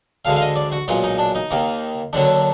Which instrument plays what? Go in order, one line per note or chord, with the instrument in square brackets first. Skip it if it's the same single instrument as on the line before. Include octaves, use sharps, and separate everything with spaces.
[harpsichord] D2 D3 G#3 F5
F5
D#5
D5
F#4
B1 A#2 G#3 F4
D#4
D4
D#4
D#2 D#3 A#3
D#2 D3 F#3 D4